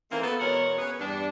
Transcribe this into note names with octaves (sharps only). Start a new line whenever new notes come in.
D#3 E3 A3 A#3 C4
B3 A4
E2 B2 G#3 A#4 C#5 F#5
B3 C#4 G#4 B4 C#5
E2 G2 G3 D4